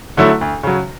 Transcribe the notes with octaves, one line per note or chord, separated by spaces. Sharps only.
D3 F#3 A3 E4
D2
C#3 F#3